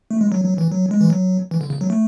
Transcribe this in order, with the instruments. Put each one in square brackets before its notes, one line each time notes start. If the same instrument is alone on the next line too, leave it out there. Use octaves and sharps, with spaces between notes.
[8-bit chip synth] A3
G#3
F#3
F#3
E3
F#3
G#3
E3
F#3
E3
D3
C#3
F#3
A3